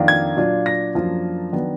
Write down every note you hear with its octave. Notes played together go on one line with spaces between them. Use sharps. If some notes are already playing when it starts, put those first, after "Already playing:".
Already playing: F2 D#3 A#3 D4 F4
G#6
A#2 F#3 D4 F4
A#6
F#2 F3 A#3 D4 F4
D#3 F#3 B3 D4